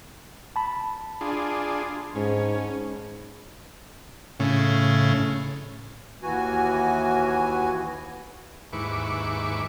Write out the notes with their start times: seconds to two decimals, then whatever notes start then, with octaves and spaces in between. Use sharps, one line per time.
0.56 A5 B5
1.21 D4 F4 G#4
2.15 G#2 C#4
4.40 A2 C#3
6.23 D#2 E3 F#4 G#5
8.73 D#2 G#2 E4 B4 C#6 D6